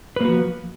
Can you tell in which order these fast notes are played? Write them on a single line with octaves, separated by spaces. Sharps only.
B4 A#3 F#4 F3